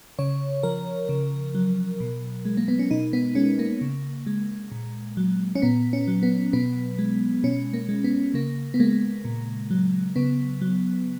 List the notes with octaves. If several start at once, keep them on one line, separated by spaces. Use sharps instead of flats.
C#3 C#5
F3 A#4
C#3
F#3
B2
G#3
A#3
B3
C#4
B2 D#4
B3
G#3 C#4
A#3
C#3
G#3
A#2
F#3
C#4
A#2 B3
C#4
F#3
B3
B2 B3
G#3
B2 C#4
A#3
G#3
B3
C#3 A#3
B3
G#3 A#3
A#2
F#3
C#3 B3
F#3